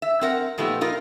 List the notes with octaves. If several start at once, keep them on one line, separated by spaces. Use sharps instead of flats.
E5
C4 A#4 F#5
A#2 F3 A3 B3 D#4 G4
D#4 F4 A#4